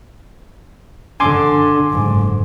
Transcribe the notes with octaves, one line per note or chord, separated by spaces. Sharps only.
D3 G#5 C6 D6
F#1 G#2